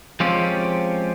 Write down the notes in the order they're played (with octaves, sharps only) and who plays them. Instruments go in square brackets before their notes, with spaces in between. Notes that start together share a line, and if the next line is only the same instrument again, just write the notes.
[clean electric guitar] F3 G#3 C4 C#4 F4 G4